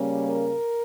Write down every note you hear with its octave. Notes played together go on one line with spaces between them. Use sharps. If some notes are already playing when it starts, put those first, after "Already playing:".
Already playing: C#3 G3 A#3 C#4
A#4